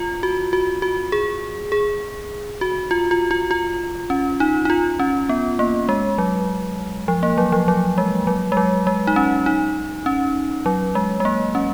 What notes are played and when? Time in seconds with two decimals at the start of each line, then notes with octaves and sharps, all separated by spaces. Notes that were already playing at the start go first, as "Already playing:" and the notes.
Already playing: F4
0.23 F#4
0.53 F#4
0.82 F#4
1.12 G#4
1.72 G#4
2.61 F#4
2.91 F4
3.11 F4
3.31 F4
3.51 F4
4.10 C#4
4.40 D#4
4.65 D#4
4.70 F4
4.99 C#4
5.29 B3
5.59 A#3
5.89 G#3
6.18 F#3
7.08 F3
7.23 A#3
7.38 F#3
7.52 F3
7.68 F#3
7.98 G#3
8.27 F#3
8.52 G#3
8.57 F#3
8.87 G#3
9.07 D#4
9.16 C#4
9.46 D#4
10.06 C#4
10.66 F#3
10.95 G#3
11.20 G#3
11.25 A#3
11.55 C#4